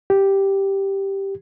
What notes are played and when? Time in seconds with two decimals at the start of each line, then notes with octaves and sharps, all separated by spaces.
0.10 G4